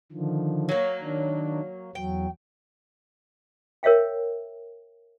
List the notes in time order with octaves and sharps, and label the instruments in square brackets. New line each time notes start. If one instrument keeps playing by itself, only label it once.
[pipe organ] D3 D#3 F3
[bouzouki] F#3 A#3
[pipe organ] D#3 D4
[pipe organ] E2 F#3 [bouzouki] G5
[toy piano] A#4 C#5 E5 F5 G5